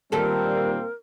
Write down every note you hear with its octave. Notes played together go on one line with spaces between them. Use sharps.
A#2 D#3 G3 A#3 C4 G4 A4 A#4